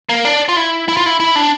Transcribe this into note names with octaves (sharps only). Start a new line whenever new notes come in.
A#3
D4
F4
E4
E4
F4
E4
E4
D4